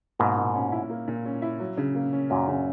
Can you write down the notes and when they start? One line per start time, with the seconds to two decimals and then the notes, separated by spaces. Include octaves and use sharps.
0.19 G#2 B2 A#3
0.37 A#2
0.54 C#4
0.72 E4
0.90 A#3
1.08 A#2
1.25 C#4
1.42 E4
1.59 F#3
1.77 C#3
1.95 A#3
2.13 C#4
2.30 F#2 A#2 F#3
2.47 C#3